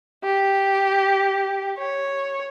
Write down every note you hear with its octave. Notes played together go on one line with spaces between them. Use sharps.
G4
C#5